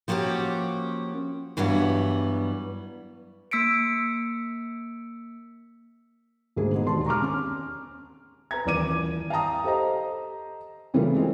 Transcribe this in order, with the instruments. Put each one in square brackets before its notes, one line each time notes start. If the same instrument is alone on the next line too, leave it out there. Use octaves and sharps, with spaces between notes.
[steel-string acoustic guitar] F3 A#3 C#4 F#4 G4
G2 E3 F#3 G3 B3
[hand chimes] A#3 E6 B6 C#7 D7
[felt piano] D2 G#2 A#3 G#4
G#3 B3 D#4
E1 D#2 A5 C6
A#5 C#6 D6 F6
C#4
B4 A#5 G#6
D#1 E3 D5 D6 D#7
F5 G5 A5 A#5 D#6
G4 A4 C5 D#5 A#5
C#3 E3 G3 A3 A#3 F4
G#3 C4